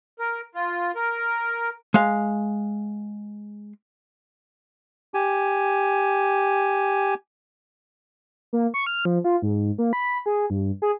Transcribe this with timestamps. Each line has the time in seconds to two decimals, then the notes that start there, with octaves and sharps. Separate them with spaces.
0.19 A#4
0.55 F4
0.95 A#4
1.94 G#3 F5
5.14 G4 G#5
8.53 A#3
8.74 C#6
8.87 F6
9.05 F3
9.24 F4
9.42 G#2
9.78 A#3
9.93 B5
10.26 G#4
10.50 G2
10.82 G#4